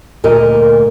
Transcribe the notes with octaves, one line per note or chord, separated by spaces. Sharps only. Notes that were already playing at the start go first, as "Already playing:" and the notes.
D2 A#2 A#4 D#5